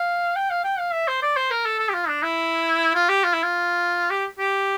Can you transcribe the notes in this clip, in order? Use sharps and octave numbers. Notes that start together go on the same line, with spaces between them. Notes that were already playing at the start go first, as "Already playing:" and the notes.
Already playing: F5
G5
F5
G5
F5
E5
C5
D5
C5
A#4
A4
A4
G4
F4
D4
E4
F4
G4
F4
E4
F4
G4
G4